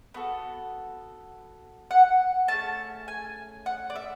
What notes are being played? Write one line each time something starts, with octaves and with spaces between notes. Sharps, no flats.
B3 F#4 A4
F#5
A3 C#4 G#4 A5
G#5
F#5
D5
E5